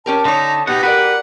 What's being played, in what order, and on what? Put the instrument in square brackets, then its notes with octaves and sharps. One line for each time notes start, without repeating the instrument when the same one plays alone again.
[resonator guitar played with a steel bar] C#4 G4 A#4 [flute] A5
[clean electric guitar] D3 [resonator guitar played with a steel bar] C#4 C#5 [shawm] D#4
[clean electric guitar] B2 F#5 [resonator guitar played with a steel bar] B3 [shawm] D#4 [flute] G4
[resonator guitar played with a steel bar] F#4 A#4 D5 [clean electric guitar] B4 [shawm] F#5